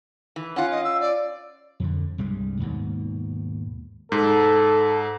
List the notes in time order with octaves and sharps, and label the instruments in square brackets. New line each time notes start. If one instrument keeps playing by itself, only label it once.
[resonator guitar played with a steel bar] E3
[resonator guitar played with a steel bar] C#4 F4 [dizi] F#5
[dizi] D#5
E6
D5
[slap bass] F2 D3
C2 G2 G3 G#3
D#2 G#2 B2
[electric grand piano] G#2 [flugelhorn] A4